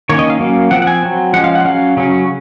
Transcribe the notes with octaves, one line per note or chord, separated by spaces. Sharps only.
D#3 A#3 C#4 C#5
D#5
F5
F#3 A#3 C#4
F3 C4 F#5
F#5
G#5
F#3 C4
F3 G#3 C#4 F#5
F5
F#5
F#3 C#4 F5
C#3 F#3 C#4